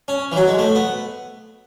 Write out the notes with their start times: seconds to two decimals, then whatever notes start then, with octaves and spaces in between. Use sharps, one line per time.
0.08 C#4
0.32 E3
0.36 F#3
0.48 G#3
0.59 A3
0.75 B3